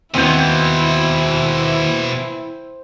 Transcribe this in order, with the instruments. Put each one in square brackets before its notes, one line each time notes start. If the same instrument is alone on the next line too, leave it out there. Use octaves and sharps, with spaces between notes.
[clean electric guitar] D#2 B3 [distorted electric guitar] B2 E3 [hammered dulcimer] C4 C5 [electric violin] E4